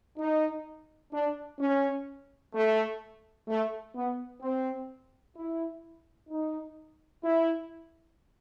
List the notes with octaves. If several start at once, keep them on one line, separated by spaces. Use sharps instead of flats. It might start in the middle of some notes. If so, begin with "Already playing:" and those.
D#4
D4
C#4
A3
A3
B3
C4
E4
D#4
E4